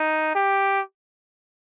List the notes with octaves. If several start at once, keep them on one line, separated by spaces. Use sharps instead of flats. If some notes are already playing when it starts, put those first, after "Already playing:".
Already playing: D#4
G4